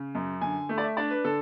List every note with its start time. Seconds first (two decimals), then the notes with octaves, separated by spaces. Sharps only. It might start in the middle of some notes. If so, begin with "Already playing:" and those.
Already playing: C#3
0.15 F#2
0.41 D3 G#5
0.69 A3
0.78 D5
0.84 E5
0.97 D4 D5
1.11 B4
1.25 D3 A4